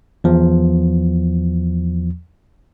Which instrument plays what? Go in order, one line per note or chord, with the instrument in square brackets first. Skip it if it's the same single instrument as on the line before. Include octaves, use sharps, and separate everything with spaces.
[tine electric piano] E2 F3